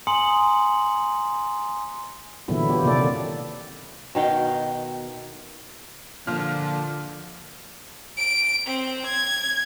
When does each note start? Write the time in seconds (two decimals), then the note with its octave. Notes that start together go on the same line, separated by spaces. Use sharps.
0.07 G#5 A#5 C6 D#6 C#7 F#7
2.48 A#2 D3 E3 F#3 B3 E4
2.69 B3 F4 G4
2.83 C3 D#3 A#3 A4 D5
4.15 B2 D#3 F5 G5
6.27 A#2 D3 F3 F6
8.17 D7
8.67 C4
9.06 G#6